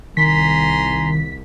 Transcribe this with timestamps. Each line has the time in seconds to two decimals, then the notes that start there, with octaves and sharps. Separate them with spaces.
0.17 C2 D#3 G#5 A#5 C6 B6